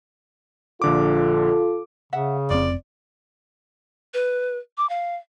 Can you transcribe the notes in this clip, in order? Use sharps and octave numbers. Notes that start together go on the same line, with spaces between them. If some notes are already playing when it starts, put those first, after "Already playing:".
A#1 D3 F4 A4 D6
C#3 E5 F#5
F1 C4 F4 D5
B4
D6
F5